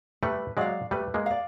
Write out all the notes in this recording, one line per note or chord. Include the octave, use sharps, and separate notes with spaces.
G3 A3 B4
F#3 G#3 D5 F5
G3 A3 B4
G#3 A#3
D5 F5